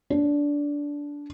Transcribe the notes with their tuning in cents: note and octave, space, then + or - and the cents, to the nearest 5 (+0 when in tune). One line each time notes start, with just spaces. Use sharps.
D4 -15